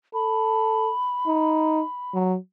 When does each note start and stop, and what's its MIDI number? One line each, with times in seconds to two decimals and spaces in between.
0.14 0.91 69
0.14 2.14 83
1.27 1.82 63
2.14 2.37 54